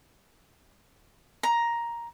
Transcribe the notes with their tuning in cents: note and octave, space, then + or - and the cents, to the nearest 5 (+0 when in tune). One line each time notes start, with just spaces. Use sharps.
A#5 +10